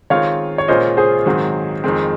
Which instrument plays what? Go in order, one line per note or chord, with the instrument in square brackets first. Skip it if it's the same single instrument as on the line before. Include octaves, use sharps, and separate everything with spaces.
[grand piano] D#3 G#3 C4 F4 [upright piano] C#5 F5
[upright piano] C#5
[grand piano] A#2 G#3 C#4 F4 [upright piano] C5 D#5
[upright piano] G#4 C5
[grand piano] G#2 D#3 F#3 C4
F2 D#3 G#3 C4